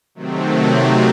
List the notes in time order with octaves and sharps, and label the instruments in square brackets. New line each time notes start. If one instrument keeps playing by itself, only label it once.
[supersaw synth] C3 D#3 F#3 A3 C4